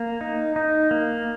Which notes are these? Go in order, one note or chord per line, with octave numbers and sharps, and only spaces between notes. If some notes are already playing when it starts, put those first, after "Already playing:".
Already playing: A#3
D#4
D#4
A#3